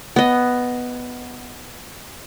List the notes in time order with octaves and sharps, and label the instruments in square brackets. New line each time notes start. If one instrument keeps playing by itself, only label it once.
[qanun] B3 D#5